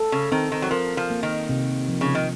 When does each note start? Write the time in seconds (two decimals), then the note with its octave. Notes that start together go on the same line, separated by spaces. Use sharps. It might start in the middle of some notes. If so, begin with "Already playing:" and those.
Already playing: A4
0.12 C#3
0.32 D#3 C4
0.52 D#3
0.62 F#3
0.70 F3 A#4
0.97 F3
1.10 A#3
1.23 D#3
1.49 C3
1.89 F3
2.01 C#3
2.15 D#3